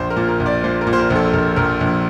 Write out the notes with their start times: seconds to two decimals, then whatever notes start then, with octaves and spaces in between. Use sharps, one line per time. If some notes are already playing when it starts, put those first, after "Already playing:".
Already playing: A#1 C5
0.10 A#4
0.17 A#2
0.28 A#4
0.40 A#1
0.46 D5
0.64 A#2 C5
0.81 A#4
0.87 A#2
0.93 C5
0.99 A#4
1.10 A#1
1.15 A4
1.33 A#1 A#4
1.56 A#1 A#4
1.81 A#1